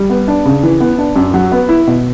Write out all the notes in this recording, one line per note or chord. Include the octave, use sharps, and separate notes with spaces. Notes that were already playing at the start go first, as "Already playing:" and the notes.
Already playing: G3
B3
D4
C#3
E3
B3
D4
F#2
F#3
B3
E4
B2